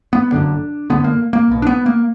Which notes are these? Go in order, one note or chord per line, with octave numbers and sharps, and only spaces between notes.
B3
F#1 F#2 D3 D4
F#1 F#2 D3 B3
A#3
A#3
B1 B2
D4
B3
A#3